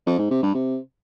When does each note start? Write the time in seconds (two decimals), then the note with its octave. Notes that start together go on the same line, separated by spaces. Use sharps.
0.07 F2
0.19 G#2
0.31 C3
0.43 G2
0.55 C3